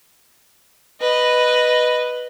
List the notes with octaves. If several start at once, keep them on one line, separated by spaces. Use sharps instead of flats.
B4 D#5